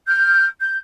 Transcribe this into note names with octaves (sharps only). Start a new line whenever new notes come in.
F6 G6
G6